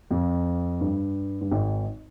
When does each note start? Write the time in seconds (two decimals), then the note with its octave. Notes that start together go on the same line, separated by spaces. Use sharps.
0.11 F2
0.81 G2
1.41 G2
1.51 G#1 G#2